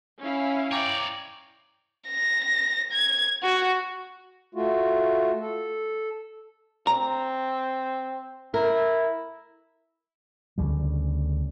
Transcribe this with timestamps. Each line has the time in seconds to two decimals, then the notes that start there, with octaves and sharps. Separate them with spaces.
0.20 C#4 E4 F5
0.72 C#5 D5 G5 A#5 D6
2.09 A#6
2.92 G#6
3.43 F#4
4.55 A3 F4 F#4
5.40 A4
6.87 C4 A#5
8.54 E4 A#4
10.58 D2 C#3 G3